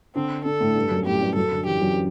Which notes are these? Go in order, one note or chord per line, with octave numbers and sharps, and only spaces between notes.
D3 C4 D4
D3 D4 A4
A2 A3
G2 G3
F#2 F#3
A2 A3 G4
G2 G3
F#2 F#3 A4
D3
E3 G4
F#2 F#3